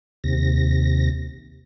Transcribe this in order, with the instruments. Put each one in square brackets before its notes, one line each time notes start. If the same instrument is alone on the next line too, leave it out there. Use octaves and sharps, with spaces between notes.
[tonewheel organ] D#2 C3 A#6